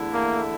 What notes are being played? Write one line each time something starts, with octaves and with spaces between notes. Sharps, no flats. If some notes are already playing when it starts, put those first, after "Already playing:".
Already playing: E2 D3 A3 E4
A#3